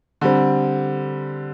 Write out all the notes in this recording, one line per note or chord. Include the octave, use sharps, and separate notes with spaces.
D3 G3 C4